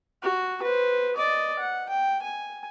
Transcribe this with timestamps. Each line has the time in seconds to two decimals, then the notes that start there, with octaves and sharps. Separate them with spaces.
0.23 F#4
0.63 B4 C5
1.16 D5 D#5
1.59 F#5
1.89 G5
2.22 G#5